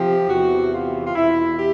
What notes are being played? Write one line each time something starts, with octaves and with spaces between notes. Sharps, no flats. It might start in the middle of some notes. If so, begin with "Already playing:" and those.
Already playing: C3 F3 G4
E2 C3 E3 F#4
F4
F4
E2 B2 E4
G4